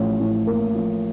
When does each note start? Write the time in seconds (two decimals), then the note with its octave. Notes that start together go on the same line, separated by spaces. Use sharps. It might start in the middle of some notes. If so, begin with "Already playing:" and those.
Already playing: A1 F3
0.20 A2
0.47 A#3
0.75 F3